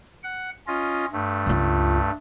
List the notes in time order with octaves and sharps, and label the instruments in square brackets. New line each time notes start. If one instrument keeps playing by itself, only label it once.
[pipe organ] F#5
C#4 F4 D#5
G2 A3
[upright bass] C#2 F4